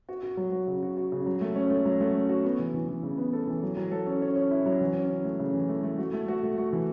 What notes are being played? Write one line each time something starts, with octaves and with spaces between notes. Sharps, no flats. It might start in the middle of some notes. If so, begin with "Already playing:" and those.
F#4
F#4
F#3
F#4
C#3
F#4
F#4
C#3
F#3
A3
C#4
A3
F#3
A3
C#4
F#4
B3
E3
E3
E3
C#3
B3
A4
E3
F#3
F#3
A4
C#4
C#4
C#4
E4
F#3
E3
C#4
C#4
A3
C#3
E3
A3
A3
F#4
A3
F#4
A3
F#4
E3